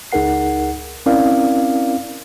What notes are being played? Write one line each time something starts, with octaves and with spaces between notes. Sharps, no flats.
C#2 D#4 G#4 A#4 F#5 C7
C4 C#4 E4 A#4 D5 F5